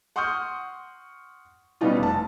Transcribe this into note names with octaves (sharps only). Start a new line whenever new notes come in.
F#5 C6 C#6 D#6 F6 G6
B2 G3 B3 C#4 D#4 F4
F1 A5